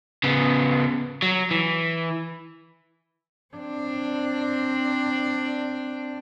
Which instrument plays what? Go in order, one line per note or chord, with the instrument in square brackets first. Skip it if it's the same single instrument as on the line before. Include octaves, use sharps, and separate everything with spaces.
[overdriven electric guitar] C#3 B3
F#3
E3
[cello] C4 D4